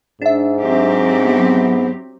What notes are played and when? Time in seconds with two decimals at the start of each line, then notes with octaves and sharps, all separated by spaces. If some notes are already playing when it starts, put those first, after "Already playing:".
0.22 G#2 D4 E5
0.61 F#3 C4 G4
1.21 B3